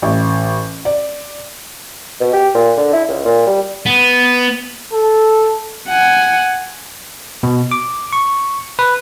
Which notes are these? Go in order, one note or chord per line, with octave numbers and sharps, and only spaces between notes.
A1
D5
B2
G4
A#2
D3
E4
C#2
A#2
G3
B3
A4
F#5 G#5
B2
D6
C#6
B4